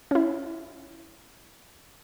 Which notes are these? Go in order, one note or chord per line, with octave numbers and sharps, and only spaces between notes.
C#4 E4